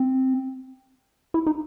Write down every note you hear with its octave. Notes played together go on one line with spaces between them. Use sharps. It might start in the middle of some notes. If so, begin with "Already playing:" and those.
Already playing: C4
E4
D#4